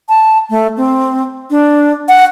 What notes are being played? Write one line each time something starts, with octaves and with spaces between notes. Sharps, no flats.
A5
A3
C4
D4
F#5